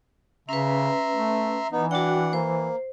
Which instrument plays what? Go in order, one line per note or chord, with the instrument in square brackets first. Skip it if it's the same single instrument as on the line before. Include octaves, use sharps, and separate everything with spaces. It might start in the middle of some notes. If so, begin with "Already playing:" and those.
[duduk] C#3 [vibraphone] C#4 B4 [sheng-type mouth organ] E5 A#5 C6
[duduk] A3
[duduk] E3 [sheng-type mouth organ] B3 D#4
[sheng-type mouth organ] D4 F#5 [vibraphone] F#4 G5
[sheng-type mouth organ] A#3 [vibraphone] C5